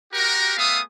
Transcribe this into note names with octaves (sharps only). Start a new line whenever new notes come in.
F#4 G4 A#4
A3 B3 G#4 E5 F5 D#6